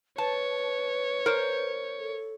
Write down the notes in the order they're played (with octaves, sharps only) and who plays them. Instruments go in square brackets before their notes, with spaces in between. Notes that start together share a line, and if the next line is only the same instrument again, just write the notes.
[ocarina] B4 [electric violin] C#5 [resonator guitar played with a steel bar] A5
[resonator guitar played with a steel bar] A#4 C5
[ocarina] A4